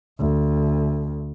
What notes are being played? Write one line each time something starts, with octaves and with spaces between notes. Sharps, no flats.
D2